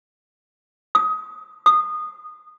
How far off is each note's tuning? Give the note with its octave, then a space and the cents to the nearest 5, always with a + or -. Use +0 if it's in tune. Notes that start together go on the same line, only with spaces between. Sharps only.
D#6 +20
D#6 -20